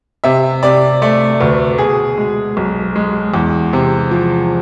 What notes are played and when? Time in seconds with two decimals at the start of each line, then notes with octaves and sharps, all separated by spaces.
0.24 C3 E5
0.63 C3 D5
1.02 A3 D5
1.40 D2 B4
1.78 B2 G#4
2.18 G#3
2.57 B1
2.96 G#3
3.34 E2
3.73 C3
4.11 F3